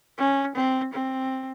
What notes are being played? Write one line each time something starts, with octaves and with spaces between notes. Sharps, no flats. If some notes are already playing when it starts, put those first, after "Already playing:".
C#4
C4
C4